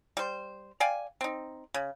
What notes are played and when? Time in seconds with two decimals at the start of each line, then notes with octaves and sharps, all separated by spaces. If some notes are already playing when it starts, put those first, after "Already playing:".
0.17 G3 C5
0.80 D5 F5 G5 G#5
1.21 C4 D#4
1.74 C#3